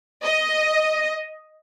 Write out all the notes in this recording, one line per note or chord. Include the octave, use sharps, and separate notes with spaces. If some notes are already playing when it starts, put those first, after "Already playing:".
D#5